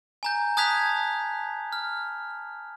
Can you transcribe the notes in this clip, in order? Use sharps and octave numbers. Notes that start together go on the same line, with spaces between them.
G#5 A#5 G6
A5 D#6 F#6 G#6 B6 F7
F6